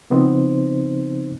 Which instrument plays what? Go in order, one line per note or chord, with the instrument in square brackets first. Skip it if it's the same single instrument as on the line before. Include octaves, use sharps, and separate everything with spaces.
[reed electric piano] C#3 F3 B3 C4 D#4 C5